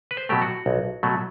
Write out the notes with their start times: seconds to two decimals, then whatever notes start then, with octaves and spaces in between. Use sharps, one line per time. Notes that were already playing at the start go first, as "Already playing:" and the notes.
0.11 B4
0.17 C5
0.29 B2 F#3 A3 G4
0.42 F#4
0.66 B1
1.03 B2 F#3 A3